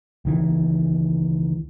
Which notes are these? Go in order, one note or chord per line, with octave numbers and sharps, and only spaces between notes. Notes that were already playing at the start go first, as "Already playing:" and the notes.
C#2 D#3 E3